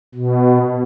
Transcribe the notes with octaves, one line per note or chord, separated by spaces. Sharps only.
B2